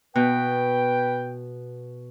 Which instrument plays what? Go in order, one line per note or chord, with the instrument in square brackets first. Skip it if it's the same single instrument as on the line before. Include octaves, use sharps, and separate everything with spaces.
[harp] B2 [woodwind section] B4 G5